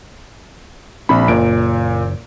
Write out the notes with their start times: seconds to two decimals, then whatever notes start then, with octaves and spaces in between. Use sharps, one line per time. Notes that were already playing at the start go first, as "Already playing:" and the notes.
1.09 A#1 C4 B5
1.28 F#1 A#2 D7